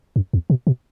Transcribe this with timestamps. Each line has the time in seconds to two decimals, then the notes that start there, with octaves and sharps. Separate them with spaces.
0.16 F#2
0.33 E2
0.50 B2
0.67 B2